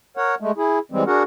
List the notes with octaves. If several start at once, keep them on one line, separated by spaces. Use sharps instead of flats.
A#4 C#5 F#5
G#3 A3
E4 G#4
E3 G3 G#3 C4
D4 F#4 G#4 A#4 F#5